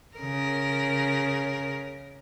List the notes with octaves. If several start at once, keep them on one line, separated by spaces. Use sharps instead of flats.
C#3 A#4